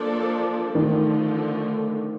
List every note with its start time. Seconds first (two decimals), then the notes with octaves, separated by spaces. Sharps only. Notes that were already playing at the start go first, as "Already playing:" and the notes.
Already playing: F3 A#3 D4 A4 D5
0.75 D3 D#3 F3 A3